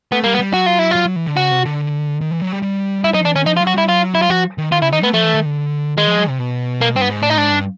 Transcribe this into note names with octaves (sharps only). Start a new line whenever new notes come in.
A3 B3
G3 A#3
B3
G3
F#3 F#4
F4
E4
F#3 F4
F#3
E3
D3
C#3 F#4
C3
D3
D#3
E3
F#3
G3
G3
G3 E4
F#3 D#4
F3
E3 D4
D#3 C#4
F3 D#4
F4
F#3
F#4
G3 E4
F#3 F4
E4
F4
F3 F#4
D#3
D#3 F4
C#3 E4
D#3 D#4
A3 B3
F3 A3
E3
D#3
D3
D#3 G#3
F3
F#3
C3
B2
A#3
G2 C4
B3
G#2
A2 D4
D#4
G#2 D4
G2